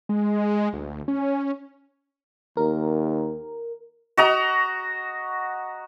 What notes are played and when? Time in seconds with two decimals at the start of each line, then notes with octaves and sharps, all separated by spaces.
0.09 G#3
0.73 D2
1.08 C#4
2.57 D#2 A#4
4.17 F#4 D#5 A#5